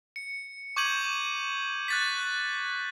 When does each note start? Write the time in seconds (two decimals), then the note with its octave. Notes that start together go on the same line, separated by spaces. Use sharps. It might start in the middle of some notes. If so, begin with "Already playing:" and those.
0.16 C#7
0.76 C#6 D6 G6 G#6 D#7 F#7
1.88 F#6 A6 B6